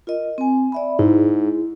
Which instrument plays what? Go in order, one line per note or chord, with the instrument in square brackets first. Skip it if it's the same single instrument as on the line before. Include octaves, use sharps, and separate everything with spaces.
[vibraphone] F4 A#4 D#5
C4 G#5
D5 E5 B5
[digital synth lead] G#2 [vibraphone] E4 G#4